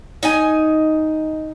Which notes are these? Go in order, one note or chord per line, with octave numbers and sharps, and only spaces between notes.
D#4 D#5 G#5